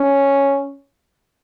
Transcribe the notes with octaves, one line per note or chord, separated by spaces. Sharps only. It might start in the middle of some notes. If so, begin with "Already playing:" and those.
Already playing: C#4